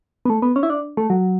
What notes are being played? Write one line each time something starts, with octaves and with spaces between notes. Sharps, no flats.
B3
A3
B3
C#4
E4
D4
A3
F#3